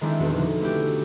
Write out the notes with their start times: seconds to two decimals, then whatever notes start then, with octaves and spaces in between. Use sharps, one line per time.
0.01 D#3 G#3 C4 D4 E4
0.19 D#1 E2 F#4
0.35 E1 D3 F3
0.61 A3 D4 E4 F#4 G4